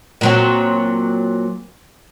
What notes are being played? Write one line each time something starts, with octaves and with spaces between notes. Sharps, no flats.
A#2 F#3 C4